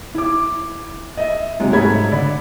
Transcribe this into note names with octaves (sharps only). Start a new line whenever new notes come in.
E4 D6
D#5 E5
C3 F#3 G#3 D#4
G#2 A3 C#5 B5 G#6
D3 D5 B5